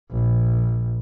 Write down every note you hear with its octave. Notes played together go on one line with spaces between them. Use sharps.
A#1